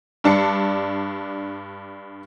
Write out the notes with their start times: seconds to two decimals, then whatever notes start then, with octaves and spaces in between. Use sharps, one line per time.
0.24 G2 D4 A5 C#7